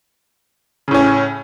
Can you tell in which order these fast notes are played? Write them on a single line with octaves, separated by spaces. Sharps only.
C#3 A2 C#4